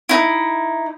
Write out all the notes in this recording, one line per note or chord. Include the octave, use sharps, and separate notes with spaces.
D#4 E4